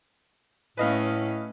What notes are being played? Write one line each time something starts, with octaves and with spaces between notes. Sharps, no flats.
A2 A3 C#4 B4 D#5 F5